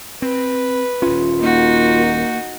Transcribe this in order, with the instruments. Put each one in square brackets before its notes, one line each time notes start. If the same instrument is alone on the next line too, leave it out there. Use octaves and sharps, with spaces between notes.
[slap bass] C4 [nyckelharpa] B4
[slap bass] D#1 C#4 [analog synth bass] F4
[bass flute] A#3 [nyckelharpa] D#4 F#4